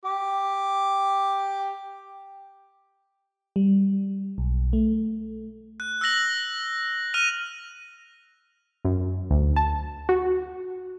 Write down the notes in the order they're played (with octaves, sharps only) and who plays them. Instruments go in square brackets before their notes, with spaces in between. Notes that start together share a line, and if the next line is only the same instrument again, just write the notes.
[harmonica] G4 D6
[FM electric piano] G3
B1
A3
[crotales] F#6
E6 F#6 A#6 F#7
F6 A#6 D#7 F7
[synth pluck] F#2
D2
A5
F#4